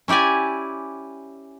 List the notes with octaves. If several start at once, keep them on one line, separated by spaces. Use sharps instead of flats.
C#4 E4 G4 D5 G#5